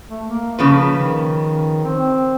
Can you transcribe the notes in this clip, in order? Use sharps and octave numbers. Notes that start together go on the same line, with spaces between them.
A3
A#3
C#3 F3 A#3 B4
D#3
C4